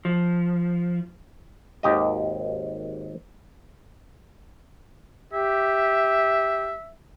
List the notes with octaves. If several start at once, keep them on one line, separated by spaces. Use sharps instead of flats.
F3
G#1 D#2 G4 D#5
G4 E5